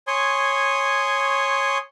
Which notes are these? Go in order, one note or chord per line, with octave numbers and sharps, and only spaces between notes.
C#5 G#5 C6 C#6 D#6